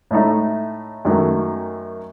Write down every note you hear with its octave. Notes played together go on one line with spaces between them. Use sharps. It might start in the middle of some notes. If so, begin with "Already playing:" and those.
A2 A3 D#4
F#2 D#3 F#3 A3